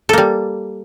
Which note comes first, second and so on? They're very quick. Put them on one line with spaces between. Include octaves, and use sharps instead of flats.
A4 A#3 G3